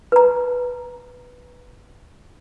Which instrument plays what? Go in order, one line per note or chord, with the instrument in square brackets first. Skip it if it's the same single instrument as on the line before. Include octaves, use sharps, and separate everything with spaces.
[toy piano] B4 A#5